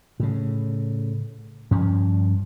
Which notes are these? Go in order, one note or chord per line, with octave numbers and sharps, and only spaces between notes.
A2 C#3
G2 F3 C#4